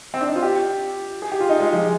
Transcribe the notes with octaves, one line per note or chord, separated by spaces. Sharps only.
C4
D4
D#4
F4
G4
G#4
G4
F4
D#4
G#3
F3